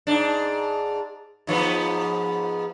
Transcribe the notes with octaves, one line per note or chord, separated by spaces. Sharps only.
G#2 D4
G#2 F3 B3